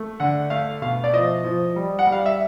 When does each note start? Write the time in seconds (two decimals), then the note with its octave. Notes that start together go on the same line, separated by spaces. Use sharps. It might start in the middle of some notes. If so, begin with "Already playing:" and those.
Already playing: A3
0.20 D3 F#5
0.50 A3 F5
0.82 B2 F5
1.04 D5
1.13 F3 D#5
1.44 F3
1.76 G3
1.99 F#5
2.07 G3
2.12 F5
2.26 E5